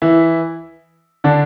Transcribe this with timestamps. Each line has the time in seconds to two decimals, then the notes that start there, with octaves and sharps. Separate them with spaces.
0.02 E3 E4
1.24 D3 D4